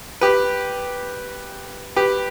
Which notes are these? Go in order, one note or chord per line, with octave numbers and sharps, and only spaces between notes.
G4 B4
G4 B4